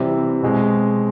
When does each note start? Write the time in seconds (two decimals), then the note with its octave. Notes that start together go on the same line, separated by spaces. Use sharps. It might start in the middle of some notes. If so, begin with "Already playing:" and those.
Already playing: C3 E3 G3 C4
0.42 B2 G#3 C4